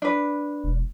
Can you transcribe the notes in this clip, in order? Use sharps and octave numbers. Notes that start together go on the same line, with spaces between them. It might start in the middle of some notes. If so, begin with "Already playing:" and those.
D4 B4
E1